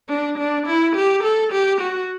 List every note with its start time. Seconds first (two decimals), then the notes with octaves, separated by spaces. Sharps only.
0.09 D4
0.38 D4
0.66 E4
0.95 G4
1.23 A4
1.52 G4
1.80 F#4